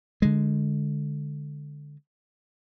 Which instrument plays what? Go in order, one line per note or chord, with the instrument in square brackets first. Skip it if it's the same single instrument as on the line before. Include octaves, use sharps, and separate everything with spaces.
[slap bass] D3 G#3